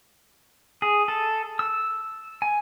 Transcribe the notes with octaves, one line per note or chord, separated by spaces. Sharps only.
G#4
A4
E6
G#5